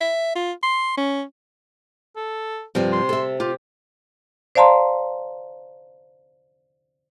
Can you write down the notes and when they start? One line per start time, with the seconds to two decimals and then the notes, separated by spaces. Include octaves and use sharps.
0.01 E5
0.35 F4
0.63 C6
0.97 C#4
2.16 A4
2.75 G2 C3 F3 C4
2.92 C6
3.09 A4 E5
3.40 F4 G4
4.55 C5 D5 F5 A5 A#5 C6